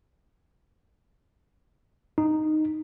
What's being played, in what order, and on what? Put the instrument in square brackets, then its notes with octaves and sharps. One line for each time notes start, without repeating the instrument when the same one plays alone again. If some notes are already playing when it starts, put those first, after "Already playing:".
[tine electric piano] D#4